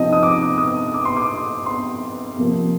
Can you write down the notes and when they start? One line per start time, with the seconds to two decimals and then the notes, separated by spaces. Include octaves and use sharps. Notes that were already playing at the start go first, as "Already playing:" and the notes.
Already playing: C3 F3 C4 D#4 D#5
0.13 D#6
0.23 D6
0.58 D#6
0.94 D6
1.05 C6
1.17 D6
1.66 C6
2.37 C3 F3 A#3